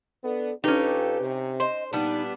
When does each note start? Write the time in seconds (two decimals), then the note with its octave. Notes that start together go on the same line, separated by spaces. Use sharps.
0.24 B3 D4 A4
0.64 F2 C#4 D#4 F4 G4 A4 B4
1.20 C3
1.60 C5 D#5
1.93 A#2 G3 B3 D4 D#4